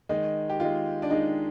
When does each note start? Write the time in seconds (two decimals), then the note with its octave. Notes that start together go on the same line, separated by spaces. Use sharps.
0.09 D#3 G#3 D#4
0.49 G4
0.60 D#3 G#3 F4
1.02 D4
1.10 D#3 G#3 D#4